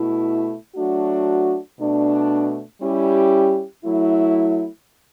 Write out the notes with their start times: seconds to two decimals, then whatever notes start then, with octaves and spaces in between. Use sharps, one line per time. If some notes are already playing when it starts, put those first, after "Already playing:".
Already playing: B2 A3 E4
0.75 F#3 A3 D4 F#4
1.79 B2 A3 D4
2.81 G3 C#4 E4 G4
3.84 F#3 A3 E4